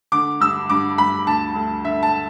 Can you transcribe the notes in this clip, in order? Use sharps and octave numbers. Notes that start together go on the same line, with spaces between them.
D3 D6
G2 E6
G2 D6
G2 B5
D2 A5
D2
D3 E5
A5